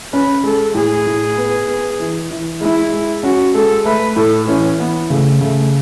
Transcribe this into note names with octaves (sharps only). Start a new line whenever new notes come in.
C#4 B4
G#3 A4
A2 G#4
A2
B3
B3
E3
E3
G#3 E4
G#3
C#4 F#4
G#3 A4
A3 B4
A2 A4
E3 C#4
E3 B3
C#3 A3
C#3 A3